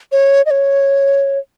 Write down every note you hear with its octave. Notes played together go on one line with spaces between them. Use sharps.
C#5
D#5
C#5